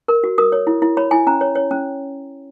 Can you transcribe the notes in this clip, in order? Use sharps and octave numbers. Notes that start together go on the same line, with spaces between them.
A#4
F#4
A#4 D#6
C#5
E4
E4
C#5 B5
E4 G#5
C#4 A#5
C#5
C#5
C#4